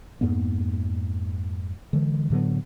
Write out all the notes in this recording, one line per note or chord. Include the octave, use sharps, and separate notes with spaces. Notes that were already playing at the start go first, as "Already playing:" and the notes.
F2 G#2 A#3 B3
D3 E3 G#3
A2 D3 F#3 B3